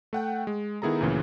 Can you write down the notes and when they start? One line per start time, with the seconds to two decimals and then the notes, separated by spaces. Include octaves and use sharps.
0.13 A3 F#5 G5
0.47 G#3
0.82 D#3 B3 E4 G#4 A4 A#5
1.01 D2 A#2 C#3 E3